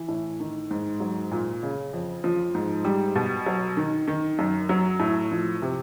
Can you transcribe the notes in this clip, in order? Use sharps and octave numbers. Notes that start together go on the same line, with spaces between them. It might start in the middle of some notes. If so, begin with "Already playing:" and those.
Already playing: E3
A2
D#3
G#2
F#3
A#2
C#3
F2
F3
G#2
G3
B2
F#3
D#3
D#3
F#2
F#3
A2
F3
C3